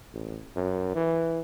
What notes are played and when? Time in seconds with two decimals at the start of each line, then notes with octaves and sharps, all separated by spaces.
0.13 A1
0.56 F#2
0.95 E3